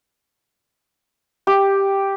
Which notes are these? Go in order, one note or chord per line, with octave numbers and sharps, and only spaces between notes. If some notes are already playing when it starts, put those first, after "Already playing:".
G4